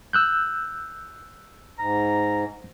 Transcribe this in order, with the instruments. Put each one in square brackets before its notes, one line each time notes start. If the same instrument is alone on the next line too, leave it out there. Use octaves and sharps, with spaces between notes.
[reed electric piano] E6 F#6 G6
[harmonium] G#2 [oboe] A#5